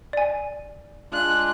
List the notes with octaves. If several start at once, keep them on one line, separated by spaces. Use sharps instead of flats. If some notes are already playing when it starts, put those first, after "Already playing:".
D5 G#5
G#3 D4 F4 F#6